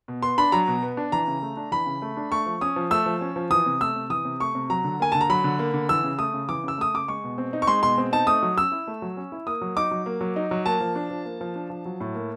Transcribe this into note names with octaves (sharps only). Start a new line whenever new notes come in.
B2
B3 C6
D4 B5
F#3 A#5
B2
B3
D4
E3 A#5
C#3
A3
D4
E3 B5
C#3
A3
D4
A3 C#6
F3
C#4 D#6
F3
A3 E6
F3
C#4
F3
E3 D#6
C3
A3 E6
C3
E3 D#6
C3
A3 C#6
C3
F#3 A#5
D3
A#3 G#5
D3 A5
A#5
F#3 B5
D3
A#3
D3
E3 E6
C#3
A3 D#6
C#3
E3 D6
C#3 E6
A3 D#6
C#3 D6
G#3 C#6
B2
C4
D#4
C#6
G#3 C6
B2 C6
C4
D#4 A5
A3 D#6
F#3
C#4 E6
E4
A3
F#3
C#4
E4
A#3 D#6
F#3
D#4 D6
F#3
A#3
F#3
D#4
F#3
A#3 A5
F3
D4
F3
A#3
F3
D4
F3
F#3
A2
A#3